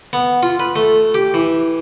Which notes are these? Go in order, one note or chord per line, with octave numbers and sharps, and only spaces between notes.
B3
F4
B4
A3
G4
E3